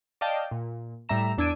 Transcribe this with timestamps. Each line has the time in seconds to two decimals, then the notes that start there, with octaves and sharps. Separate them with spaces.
0.21 D5 D#5 F5 G5 A5
0.51 A#2
1.09 A2 G3 E5 A#5 E7
1.38 E2 D4 E6 G#6 D7 D#7